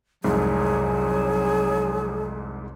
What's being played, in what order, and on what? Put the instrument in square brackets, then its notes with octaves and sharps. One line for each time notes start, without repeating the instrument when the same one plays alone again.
[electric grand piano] C2 F2 G#2 [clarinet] F#3 [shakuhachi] G#4